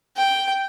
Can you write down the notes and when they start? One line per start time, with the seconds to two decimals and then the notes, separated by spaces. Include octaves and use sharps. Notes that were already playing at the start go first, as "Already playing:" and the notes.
0.17 G5